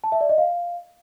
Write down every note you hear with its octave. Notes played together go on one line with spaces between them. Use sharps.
A5
E5
D5
D#5
F5